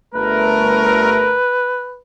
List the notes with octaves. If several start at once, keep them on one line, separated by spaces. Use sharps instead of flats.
G1 A3 A#4 B4